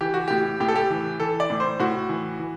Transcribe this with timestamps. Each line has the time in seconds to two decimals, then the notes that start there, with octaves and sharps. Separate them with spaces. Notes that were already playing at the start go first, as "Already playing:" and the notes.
0.01 E3 G4
0.14 F#4
0.28 A2 G4
0.60 A2 G4
0.68 A4
0.76 G4
0.90 E3
1.20 E3 A4
1.40 D5
1.50 A2
1.60 C5
1.80 A2 F#4
2.09 E3
2.40 E3